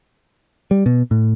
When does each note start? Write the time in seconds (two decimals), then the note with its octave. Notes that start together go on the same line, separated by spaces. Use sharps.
0.71 G3
0.86 B2
1.11 A2